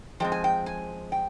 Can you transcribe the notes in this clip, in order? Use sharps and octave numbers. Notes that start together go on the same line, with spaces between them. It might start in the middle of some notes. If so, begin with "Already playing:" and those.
F3 G#3 C4 G5
G#5
G5
G#5
G5